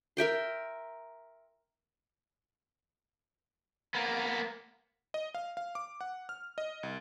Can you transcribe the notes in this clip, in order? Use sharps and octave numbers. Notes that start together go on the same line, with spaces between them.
A#4 E5 G5 C6
A#3 B3
D#5
F5
F5
D6
F#5
F6
D#5
C2